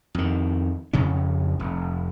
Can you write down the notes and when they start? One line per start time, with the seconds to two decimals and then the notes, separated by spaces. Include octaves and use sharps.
0.15 F2 D#3
0.93 F2 C#3 C#4
1.60 F1